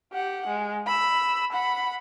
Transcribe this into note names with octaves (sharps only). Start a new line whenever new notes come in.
G4 F#5
G#3
B5 E6
F#5 B5